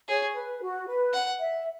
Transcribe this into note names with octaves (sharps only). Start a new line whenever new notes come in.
G#4 C#5
B4
F#4
B4
F#5
E5